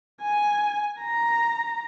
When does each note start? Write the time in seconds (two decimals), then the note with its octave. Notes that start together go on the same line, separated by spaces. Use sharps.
0.22 G#5
1.02 A#5